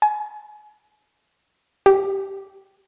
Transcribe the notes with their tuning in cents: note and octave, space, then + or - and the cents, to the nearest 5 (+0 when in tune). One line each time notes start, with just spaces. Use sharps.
G#5 +25
G4 -10